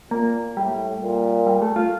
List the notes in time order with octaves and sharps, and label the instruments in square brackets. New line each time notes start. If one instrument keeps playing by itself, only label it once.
[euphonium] A#2 [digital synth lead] A#3
[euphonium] A2 [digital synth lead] G3
[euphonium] A#2
[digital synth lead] G3
A3
F4